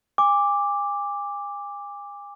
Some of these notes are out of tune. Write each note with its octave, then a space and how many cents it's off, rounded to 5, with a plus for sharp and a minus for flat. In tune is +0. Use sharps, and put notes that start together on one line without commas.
G#5 -40 D6 +0